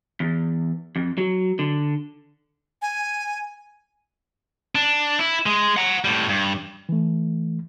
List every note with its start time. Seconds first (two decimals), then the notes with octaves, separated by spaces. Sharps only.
0.20 E2
0.96 F2
1.18 F#3
1.59 D3
2.82 G#5
4.75 D4
5.19 E4
5.46 G#3
5.77 F#5 A#5
6.05 A2 G3
6.29 G2
6.89 E3 A3